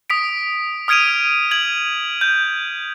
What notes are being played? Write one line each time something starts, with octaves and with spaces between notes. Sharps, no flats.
D#6 B6 D7
D#6 F6 G#6 D7 D#7 F7
G#6 F#7
G6